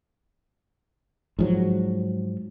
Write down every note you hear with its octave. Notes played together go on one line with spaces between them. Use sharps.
G#2 F3 F#3